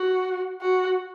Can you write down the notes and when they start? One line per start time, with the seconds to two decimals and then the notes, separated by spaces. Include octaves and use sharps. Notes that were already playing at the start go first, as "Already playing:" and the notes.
Already playing: F#4
0.61 F#4